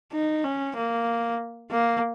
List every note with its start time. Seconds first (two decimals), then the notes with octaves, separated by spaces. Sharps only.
0.13 D#4
0.44 C#4
0.76 A#3
1.71 A#3